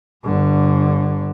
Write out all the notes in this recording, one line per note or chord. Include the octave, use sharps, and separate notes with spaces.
G1 D3